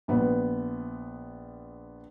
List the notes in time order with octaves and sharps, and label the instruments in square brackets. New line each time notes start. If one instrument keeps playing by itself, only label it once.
[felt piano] A#1 B3